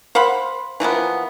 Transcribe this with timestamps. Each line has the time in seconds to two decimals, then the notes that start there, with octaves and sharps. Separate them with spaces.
0.15 C5 F5 F#5 B5
0.80 E3 F3 A#3 B3